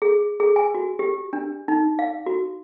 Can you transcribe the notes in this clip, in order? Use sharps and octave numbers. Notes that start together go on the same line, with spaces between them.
G#4
G#4
G#5
F#4
G4
D4
D#4
F5
F#4